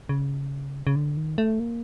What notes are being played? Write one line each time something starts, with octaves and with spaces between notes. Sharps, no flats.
C#3
C#3
D3
D#3
A3
A#3